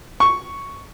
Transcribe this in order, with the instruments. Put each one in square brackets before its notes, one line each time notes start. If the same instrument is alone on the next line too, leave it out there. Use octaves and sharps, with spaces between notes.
[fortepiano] C#6